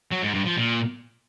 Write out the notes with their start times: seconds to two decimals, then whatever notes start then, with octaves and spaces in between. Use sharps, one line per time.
0.12 F#3
0.24 G#2
0.35 G2
0.46 F3
0.58 A#2